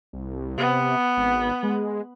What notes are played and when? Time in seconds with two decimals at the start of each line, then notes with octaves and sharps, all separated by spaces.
0.13 C2
0.58 C3 B3
1.17 G#1
1.63 G#3